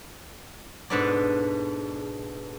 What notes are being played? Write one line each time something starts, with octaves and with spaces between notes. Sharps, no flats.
G#2 B2 D4 A4 B4 D5